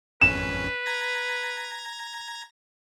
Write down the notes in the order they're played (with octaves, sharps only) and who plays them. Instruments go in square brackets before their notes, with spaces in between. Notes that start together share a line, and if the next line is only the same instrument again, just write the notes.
[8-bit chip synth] G#1 F2 C#4 [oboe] B4 [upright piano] E7
[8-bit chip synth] A#5 G#6 A#6